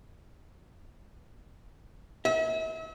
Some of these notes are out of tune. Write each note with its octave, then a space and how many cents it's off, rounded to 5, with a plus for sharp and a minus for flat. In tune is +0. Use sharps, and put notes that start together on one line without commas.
E5 -40